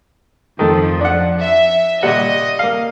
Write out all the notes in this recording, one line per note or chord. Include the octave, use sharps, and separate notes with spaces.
F2 D#3 F3 A3
D4 F#5
E5
A#2 G3 D#5 F#5
A#3 F5